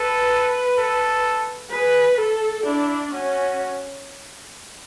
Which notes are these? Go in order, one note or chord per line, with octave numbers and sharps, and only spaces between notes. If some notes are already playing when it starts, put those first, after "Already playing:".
Already playing: A4 B4
A4
G#4 B4
A4
D4 E4
C#4 F#4